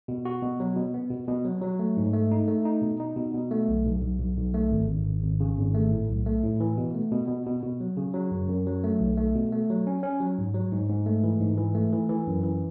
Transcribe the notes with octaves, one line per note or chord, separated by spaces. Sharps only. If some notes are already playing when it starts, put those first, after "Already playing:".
B2
F#4
B2
F#3
B2
B3
B2
B2
F#3
F#3
A3
G#2
A3
D#4
A3
D#4
B2
D#4
B2
B2
A3
B1
B1
B1
B1
B1
A3
G#1
G#1
G#1
G#1
C#3
G#1
A3
A2
B1
A3
A2
E3
B2
A3
B2
B2
B2
B2
F#3
C#3
F#3
F#2
F#2
F#3
A3
B1
A3
B2
A3
F#3
C#4
C#4
F#3
G#2
F#3
G#2
G#2
A3
E3
G#2
E3
A3
E3
E3
F#2
E3